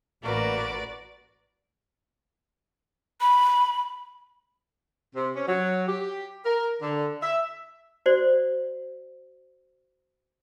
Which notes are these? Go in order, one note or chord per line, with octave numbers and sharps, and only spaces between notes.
A1 A#3 F#4 A#4 B4 D5
B5
C3
C#4
F#3
G4
A#4
D3
E5
F#4 C5 D5